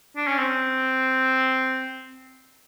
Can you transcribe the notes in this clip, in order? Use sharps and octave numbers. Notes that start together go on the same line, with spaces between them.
D4
C#4
C4